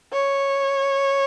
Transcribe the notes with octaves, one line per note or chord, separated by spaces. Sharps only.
C#5